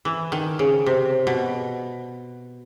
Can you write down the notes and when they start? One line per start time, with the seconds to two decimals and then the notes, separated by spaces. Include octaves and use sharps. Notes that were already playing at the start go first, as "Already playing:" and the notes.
0.05 E3
0.32 D#3
0.59 C#3
0.86 C3
1.27 B2